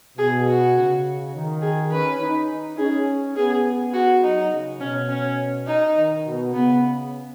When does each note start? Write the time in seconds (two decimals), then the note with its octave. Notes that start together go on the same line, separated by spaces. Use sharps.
0.17 B2 G#4
0.47 F#4
0.76 C#3
1.34 D#3
1.62 G#4
1.92 C#4 B4
2.20 D#4
2.78 C#4 G#4
3.36 B3 G#4
3.94 F#4
4.22 F#3 D#4
4.51 C#3
4.80 B2 C#4
5.09 C#4
5.67 D#4
5.96 D#3
6.25 B2
6.53 C#3 B3